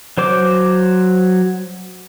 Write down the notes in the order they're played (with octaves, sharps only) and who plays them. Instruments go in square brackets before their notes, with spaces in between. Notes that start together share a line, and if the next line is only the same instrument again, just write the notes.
[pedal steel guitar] F#3 C5 D6